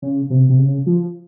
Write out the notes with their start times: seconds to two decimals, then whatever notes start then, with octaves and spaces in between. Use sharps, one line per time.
0.02 C#3
0.30 C3
0.49 C3
0.59 C#3
0.86 F3